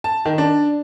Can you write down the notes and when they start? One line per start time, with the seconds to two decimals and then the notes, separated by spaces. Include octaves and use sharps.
0.04 A5
0.25 D#3
0.38 D4